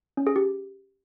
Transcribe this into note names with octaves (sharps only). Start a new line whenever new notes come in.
C#4
G#4
G4